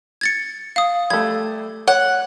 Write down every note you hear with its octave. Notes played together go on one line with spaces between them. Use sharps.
G#6 A6 C#7
F5 D#6
G3 A3 G#6
C#5 F#5